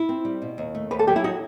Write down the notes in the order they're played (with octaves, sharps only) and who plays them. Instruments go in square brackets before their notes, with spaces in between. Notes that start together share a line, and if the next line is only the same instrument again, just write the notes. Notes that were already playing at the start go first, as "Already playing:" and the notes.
Already playing: [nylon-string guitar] E4
C4
G3
B2
D#2
A3
[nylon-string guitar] D#2 [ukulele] B4
[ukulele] A4
[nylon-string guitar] F#3 [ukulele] G4
[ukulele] E4
[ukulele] D#4 [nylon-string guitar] F#4